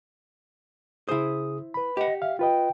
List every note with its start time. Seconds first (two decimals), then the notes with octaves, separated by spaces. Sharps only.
1.09 C#3 E4 G#4 C5 D#6
1.74 B4 B5
1.97 G4 D#5 F#5
2.22 E5 F5
2.39 F4 B4 D#5 G5